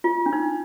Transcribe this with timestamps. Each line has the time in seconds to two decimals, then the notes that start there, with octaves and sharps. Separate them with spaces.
0.04 F4
0.26 D4
0.33 D#4